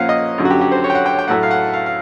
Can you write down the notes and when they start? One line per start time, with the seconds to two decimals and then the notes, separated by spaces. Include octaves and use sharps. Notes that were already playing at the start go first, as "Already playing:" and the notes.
Already playing: A#2 F3 A#3 C#4 F5 F#5
0.09 D#5
0.38 F#2 D3 F#3
0.45 F#4
0.50 G4
0.61 G4
0.72 C5
0.84 C#5
0.90 G5
0.95 F#5
1.06 G5
1.19 G5
1.28 A2 F#3 A3 F#5
1.43 F5
1.51 F#5
1.74 F5
1.86 F5